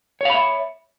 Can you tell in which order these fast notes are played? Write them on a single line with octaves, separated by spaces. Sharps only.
C#5 F5 B5 E5